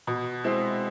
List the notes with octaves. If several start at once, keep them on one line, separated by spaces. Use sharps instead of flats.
B2
G#3 C4 E4